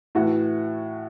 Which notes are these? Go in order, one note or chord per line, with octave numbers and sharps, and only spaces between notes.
A2 E3 F#4